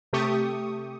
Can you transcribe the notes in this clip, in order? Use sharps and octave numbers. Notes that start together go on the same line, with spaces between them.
C3 A3 G4 C#6 D#6